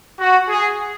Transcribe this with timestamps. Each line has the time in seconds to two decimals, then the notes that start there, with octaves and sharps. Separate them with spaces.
0.20 F#4
0.48 G#4